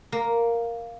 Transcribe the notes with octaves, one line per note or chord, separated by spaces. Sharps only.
A#3